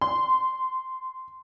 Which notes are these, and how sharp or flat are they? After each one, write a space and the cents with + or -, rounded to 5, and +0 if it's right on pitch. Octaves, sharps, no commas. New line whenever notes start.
C6 -15